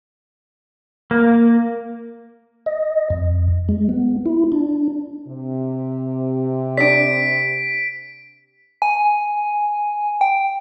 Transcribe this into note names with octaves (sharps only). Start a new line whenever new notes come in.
A#3
D#5
F2
G#3
B3
E4
D4
C3
D4 G4 D5 B6 D7
G#5
G5